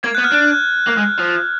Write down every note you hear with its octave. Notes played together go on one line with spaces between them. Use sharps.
A#3 G#6
B3 F#6
F6
D4 F#6
A#3
G#3
F3